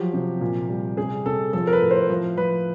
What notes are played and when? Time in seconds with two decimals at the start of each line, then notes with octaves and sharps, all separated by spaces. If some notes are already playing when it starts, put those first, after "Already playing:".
Already playing: F3 F#3 G4
0.13 C3
0.41 A#2
0.69 G3
0.97 C3 G#4
1.26 C3 A4
1.53 F3 A4
1.67 A#4
1.73 B4
1.81 A2
1.91 C5
2.10 F3
2.37 F3 B4